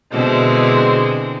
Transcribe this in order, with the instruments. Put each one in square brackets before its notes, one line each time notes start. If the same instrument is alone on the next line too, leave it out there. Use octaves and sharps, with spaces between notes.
[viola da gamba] B2 D3 E4 [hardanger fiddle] G#3 C4